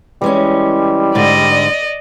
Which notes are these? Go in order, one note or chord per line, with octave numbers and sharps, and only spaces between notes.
E3 G3 G#3 C#4
G#2 D3 D5 D#5